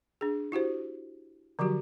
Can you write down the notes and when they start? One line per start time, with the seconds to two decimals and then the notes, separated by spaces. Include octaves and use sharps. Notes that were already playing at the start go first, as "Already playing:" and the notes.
0.21 D4 G#4
0.52 E4 F#4 G4 C5
1.59 D3 F3 F#3 F#4 G4